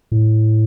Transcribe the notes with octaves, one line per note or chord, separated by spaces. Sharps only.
A2